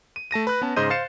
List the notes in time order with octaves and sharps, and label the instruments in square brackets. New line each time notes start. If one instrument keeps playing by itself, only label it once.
[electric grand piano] D#7
A3 A5 A#6 D#7
B4 F#6
B3 C#4 A5
G#2 C#3 C5 D#5 G6 D#7
C5 F5 A6 C7 C#7 E7